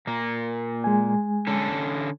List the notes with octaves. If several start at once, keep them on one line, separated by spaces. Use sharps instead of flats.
A#2 A#3
G#3 G#5
D3 C#4 A4